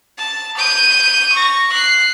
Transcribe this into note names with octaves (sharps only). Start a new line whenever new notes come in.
A5
G6 D#7
C#6 A#6
F#6 C7